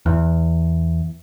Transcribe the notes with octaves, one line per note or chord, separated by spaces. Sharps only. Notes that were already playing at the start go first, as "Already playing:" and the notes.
E2